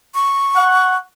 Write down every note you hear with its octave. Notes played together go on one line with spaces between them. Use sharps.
C#6
F#5